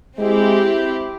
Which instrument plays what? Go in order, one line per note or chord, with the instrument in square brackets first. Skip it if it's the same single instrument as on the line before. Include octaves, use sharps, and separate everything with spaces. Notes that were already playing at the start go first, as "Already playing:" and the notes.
[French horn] G#3 [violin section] C4 E4 G4